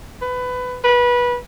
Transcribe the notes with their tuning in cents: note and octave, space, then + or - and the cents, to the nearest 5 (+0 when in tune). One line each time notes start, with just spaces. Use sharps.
B4 +20
B4 -20